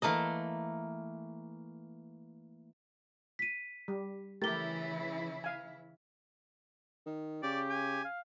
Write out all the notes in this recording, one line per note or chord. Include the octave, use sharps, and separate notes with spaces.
E3 A3 A#3 D#5
B6 D#7
G3
C#3 E3 A3 E4 G4 A#4 A6 G7
F5 G#5
D#3
C#3 G4 D5
G#5
F5